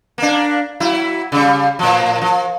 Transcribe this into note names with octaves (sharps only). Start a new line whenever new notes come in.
A#3 D4
F#3 E4
C#3 G3
A2 F3
F3